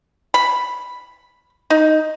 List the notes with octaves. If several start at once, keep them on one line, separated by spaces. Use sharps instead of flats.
B5
D#4